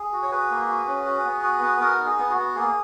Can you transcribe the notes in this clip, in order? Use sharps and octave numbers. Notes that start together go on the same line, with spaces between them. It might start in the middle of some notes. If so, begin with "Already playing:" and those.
Already playing: G#4
F#4
C#5
F#4 G#4 B4
A#3
F#4
C#4
F#4
B3
F#4
B3
B3 F#4 A#4
D#4
G#4
B3
F#4
B3
A#3 G#4